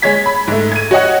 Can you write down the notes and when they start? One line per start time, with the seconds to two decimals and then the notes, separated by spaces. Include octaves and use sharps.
0.02 G#3 C#5 G#6 B6
0.26 B5
0.48 G#2 A3
0.72 G#6 D#7
0.91 F#4 C#5 D#5 F#5